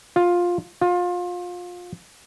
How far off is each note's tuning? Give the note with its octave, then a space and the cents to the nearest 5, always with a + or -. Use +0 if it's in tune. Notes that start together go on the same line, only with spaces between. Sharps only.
F4 +10
F4 +25